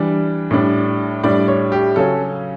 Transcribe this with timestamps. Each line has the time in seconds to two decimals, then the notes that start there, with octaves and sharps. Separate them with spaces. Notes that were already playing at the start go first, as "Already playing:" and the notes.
Already playing: E3 G3 D4
0.51 A2 G3 D4
1.23 A2 G3 D4 D5
1.48 C#5
1.72 G4
1.96 C#3 F#3 C#4 A4